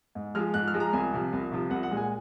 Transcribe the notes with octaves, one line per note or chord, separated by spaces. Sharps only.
G#2
F3 G#3 F6
G#2 F#6
F6
F3 G#3
A#5
C2 G#5
C3 F3
C2
C3 F3
C2 F#5
F#5
A#2 G#3
G#5